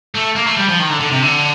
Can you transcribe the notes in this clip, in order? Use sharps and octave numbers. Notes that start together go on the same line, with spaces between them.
A3
A#3
A3
G3
F3
D#3
D3
D3
C3
D3